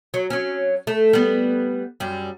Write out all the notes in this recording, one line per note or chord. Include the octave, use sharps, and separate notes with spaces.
F#3
F#3 C#4
A3
G3 B3
F#2 G3